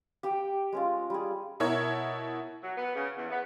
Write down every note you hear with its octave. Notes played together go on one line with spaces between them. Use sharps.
G4 G5
G#3 C#4 F4
G3 G#4
B2 E4 A#4 C#5 G#6
F#3
B3
C#3
E2
B3